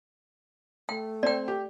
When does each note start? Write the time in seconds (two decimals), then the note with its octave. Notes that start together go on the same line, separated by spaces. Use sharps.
0.89 A3 G5
1.23 C4 D5 G5
1.48 G4